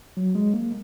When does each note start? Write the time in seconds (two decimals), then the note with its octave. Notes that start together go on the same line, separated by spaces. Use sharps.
0.17 F#3
0.35 G#3
0.54 A#3